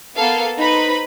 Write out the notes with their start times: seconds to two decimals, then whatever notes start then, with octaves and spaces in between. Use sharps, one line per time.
0.16 A#3 B3 A4 F5
0.58 D#4 B4 C5 B5